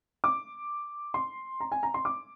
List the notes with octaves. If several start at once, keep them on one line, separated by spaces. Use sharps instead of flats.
D6
C6
A#5
G#5
A#5
C6
D6